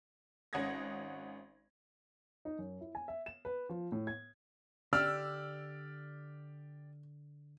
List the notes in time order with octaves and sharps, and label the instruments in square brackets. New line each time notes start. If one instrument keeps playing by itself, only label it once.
[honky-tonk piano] G#1 C#4 F#5 D#6 G#6 A#6
[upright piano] D#4
F#2
E4
G#5
E5
E7
B4
F3
A2
G#6
[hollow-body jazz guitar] D3 [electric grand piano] G4 D5 [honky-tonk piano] E6 [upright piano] F6